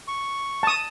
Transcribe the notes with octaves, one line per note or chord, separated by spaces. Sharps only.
C#6
A5 D#6